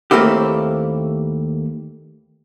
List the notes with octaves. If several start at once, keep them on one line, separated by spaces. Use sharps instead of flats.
D#2 A3 A#3 C4 E4 G4